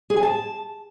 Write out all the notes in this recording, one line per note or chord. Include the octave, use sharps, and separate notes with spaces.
G#4
G#5
A5